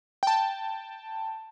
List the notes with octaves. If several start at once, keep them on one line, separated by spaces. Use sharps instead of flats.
G5 A5